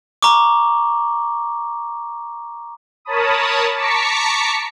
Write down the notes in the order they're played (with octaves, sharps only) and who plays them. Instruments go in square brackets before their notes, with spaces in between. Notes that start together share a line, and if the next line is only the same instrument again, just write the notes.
[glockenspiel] A#5 C#6 D6
[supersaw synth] A#4 C#5 A5 B5 D#6
A5 A#5 C#6 D6 B6 C#7